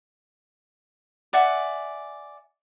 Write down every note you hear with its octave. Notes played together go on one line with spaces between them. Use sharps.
D5 E5 F#5 G#5